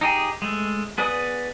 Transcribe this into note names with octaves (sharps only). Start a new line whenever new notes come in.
D#4 G4 G#4
G#3 A3
B3 G#4 B4 D5 D#6